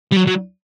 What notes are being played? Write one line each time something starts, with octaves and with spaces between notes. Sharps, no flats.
G3
F#3
F#3